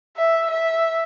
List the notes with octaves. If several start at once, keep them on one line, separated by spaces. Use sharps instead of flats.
E5
E5